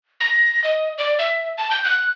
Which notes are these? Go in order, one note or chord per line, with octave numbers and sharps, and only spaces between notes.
A#6
D#5
D5
E5
A5
G6
F#6